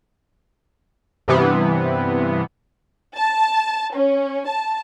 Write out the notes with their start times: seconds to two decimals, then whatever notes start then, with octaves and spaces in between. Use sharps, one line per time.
1.28 G2 C3 E3 B3
3.16 A5
3.94 C#4
4.46 A5